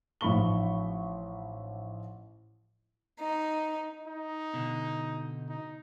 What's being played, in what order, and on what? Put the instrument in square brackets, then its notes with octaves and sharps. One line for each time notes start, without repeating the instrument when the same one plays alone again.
[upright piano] A1 F3 D#4 B5 C#6 G7
[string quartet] D#4
[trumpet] D#4
[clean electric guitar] B2 D3
[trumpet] D#4